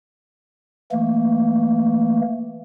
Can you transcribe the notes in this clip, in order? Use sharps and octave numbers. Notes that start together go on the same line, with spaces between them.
E3 A3 A#3